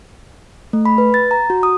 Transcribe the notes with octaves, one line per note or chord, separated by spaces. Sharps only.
A3
B5
B4
A6
A#5
F#4
D#6